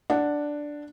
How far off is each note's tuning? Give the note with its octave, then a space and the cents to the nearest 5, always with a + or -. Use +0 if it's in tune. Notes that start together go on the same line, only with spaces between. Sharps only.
D4 +0 F#5 +0